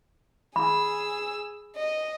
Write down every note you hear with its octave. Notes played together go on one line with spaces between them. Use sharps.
G#4 B5 E6
D#5